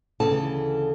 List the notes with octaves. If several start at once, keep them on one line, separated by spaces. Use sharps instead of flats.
D2 C#3 E3 A4 A5